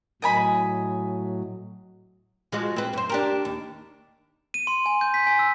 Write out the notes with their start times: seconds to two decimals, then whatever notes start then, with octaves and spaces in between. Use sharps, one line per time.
0.22 A2 F#3 D#5 G#5 B5
2.52 F3 G#3 F#4
2.76 C4 B4
2.93 F#2 C5
3.10 D4 G4 A#4
3.45 D#2
4.54 D#7
4.67 C6
4.86 G#5
5.01 G6
5.14 B6
5.27 G#5
5.39 E6